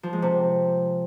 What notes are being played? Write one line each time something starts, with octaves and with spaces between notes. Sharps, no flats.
F3
G#3
C3